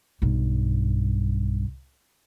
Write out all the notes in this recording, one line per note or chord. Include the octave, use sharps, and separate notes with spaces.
B1 G2